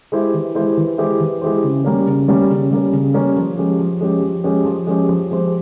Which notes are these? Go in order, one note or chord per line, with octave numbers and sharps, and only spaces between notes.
G#3 E4 G4 C5
E3
G#3 E4 G4 C5
E3
G#3 E4 G4 C5
E3
G#3 E4 G4 C5
C#3
G3 A#3 C#4
C#3
G3 A#3 C#4
C#3
G3 A#3 C#4
C#3
G3 A#3 C#4
F3
G#3 C#4 G4
F3
G#3 C#4 G4
F3
G#3 C#4 G4
F3
G#3 C#4 G4
F3
G#3 C4 G4 C5